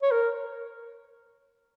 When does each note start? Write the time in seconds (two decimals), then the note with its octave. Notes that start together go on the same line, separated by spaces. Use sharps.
0.02 C#5
0.11 A#4